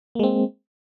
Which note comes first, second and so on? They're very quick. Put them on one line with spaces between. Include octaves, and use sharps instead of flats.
A#3 G#3 C4